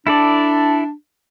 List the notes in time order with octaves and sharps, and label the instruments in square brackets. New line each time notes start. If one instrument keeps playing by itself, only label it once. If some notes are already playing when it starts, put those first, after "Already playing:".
[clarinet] D4 [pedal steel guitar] E4 A4 D5